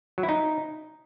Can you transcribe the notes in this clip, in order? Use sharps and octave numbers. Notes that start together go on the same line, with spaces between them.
F#3
E4
D#4